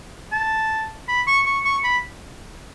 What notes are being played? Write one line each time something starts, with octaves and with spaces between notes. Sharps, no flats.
A5
B5
C#6
C#6
C#6
B5